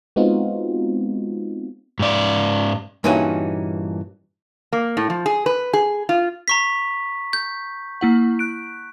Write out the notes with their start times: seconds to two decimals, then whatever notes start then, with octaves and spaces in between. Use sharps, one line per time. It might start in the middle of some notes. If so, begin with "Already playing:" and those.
0.16 G#3 B3 C4 D#4 F4 F#4
1.99 G#2 D5
3.04 G2 A#2 E3 C#4 D#4 F#4
4.73 A#3
4.97 A2
5.10 F3
5.26 G#4
5.46 B4
5.73 G#4
6.09 F4
6.48 A#5 C#6 B6
7.33 G6
8.01 A#3 E4 F#5
8.39 F#6 D7